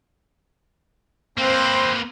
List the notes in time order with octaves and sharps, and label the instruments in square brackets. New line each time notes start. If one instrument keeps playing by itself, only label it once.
[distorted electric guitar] A#3 B4 [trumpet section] C4 C5